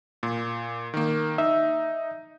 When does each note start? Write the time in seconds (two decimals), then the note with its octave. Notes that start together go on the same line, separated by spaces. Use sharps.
0.23 A#2
0.94 D#3 A#3
1.38 D#4 E5